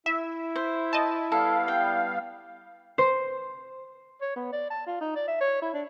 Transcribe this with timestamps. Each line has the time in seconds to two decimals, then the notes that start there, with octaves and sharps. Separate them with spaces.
0.06 E4 E5
0.56 C5
0.93 D#5 A5
1.32 G3 B3 A4 F5
1.68 G5
2.98 C5
4.21 C#5
4.36 B3
4.52 D5
4.70 A5
4.87 F4
5.01 D#4
5.16 D5
5.28 E5
5.41 C#5
5.62 E4
5.74 D4